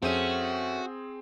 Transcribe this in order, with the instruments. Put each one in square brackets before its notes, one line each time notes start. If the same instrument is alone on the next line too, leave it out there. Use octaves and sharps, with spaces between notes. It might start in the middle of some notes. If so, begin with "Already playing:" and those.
[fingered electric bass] F2 [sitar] A3 C#4 [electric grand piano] C4 G#4 D#7 [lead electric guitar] F#4